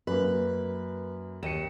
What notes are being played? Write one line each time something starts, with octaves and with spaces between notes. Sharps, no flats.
F#2 A#3 B4
D#2 C#7 D#7 E7